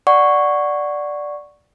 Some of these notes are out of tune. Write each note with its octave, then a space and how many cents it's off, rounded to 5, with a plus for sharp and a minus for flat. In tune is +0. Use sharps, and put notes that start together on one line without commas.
D5 +0 F#5 +0 C#6 +0